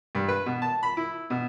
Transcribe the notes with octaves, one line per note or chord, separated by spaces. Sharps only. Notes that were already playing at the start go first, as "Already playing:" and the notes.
G2
B4
B2
A5
B5
E4
B2